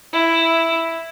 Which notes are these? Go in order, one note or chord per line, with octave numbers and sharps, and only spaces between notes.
E4